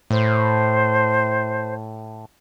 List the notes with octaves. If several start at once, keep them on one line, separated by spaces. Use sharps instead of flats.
A2 C5